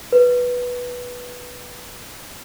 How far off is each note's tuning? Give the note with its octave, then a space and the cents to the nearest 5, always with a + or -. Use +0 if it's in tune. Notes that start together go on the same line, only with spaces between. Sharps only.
B4 -10